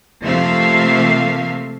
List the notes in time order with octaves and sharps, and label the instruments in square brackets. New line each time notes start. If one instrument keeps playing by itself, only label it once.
[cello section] C3 F3 A3 A#3 E5 F5